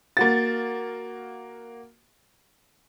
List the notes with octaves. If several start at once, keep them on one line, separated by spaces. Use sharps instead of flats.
A#3 F#4 A6